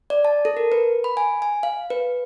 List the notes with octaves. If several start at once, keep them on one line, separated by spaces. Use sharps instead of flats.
D5
A5
A4
A#4
B4
B5
G#5
G#5
F5
B4